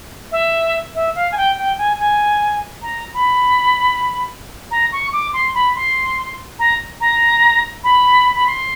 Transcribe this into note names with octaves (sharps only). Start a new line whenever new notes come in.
E5
E5
F5
G#5
G5
G5
G#5
G#5
A#5
B5
A#5
C#6
D6
C6
B5
C6
A#5
A#5
B5
B5
C6